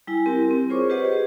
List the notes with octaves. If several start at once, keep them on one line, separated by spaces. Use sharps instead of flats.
G3 E4 G#5
C4 G4 A#4
C4
F4 G#4 C5 C#5 C#6 D6
G4 B4 C5 D#5 F#5
G4 G#4